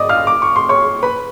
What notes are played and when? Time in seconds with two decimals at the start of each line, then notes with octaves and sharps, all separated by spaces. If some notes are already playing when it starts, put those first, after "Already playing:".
Already playing: D5 D#5 D6 D#6
0.09 F5 F6
0.27 D6
0.42 C#6
0.56 C6
0.69 C#5 C#6
1.03 B4 B5